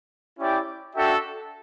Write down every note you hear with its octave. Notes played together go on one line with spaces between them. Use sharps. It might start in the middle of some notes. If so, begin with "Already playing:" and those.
C#4 E4 G4 D5 G5
D4 F#4 A4 E5 G5